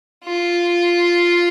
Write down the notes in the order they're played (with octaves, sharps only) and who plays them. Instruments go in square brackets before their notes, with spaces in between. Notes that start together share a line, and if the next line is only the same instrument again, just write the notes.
[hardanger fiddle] F4